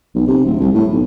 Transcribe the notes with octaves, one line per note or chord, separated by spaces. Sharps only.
B1
C3
D1
C2
A2
B1